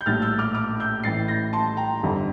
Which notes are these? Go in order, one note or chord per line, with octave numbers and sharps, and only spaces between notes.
G6
A#1 A2 G3 F6 A6
E6 G6
D6 F6
D6 F6
E6 G6
A1 A2 E3 A6 C7
G6 A#6
A5 C6
G5 A#5
G1 F2 D3 G3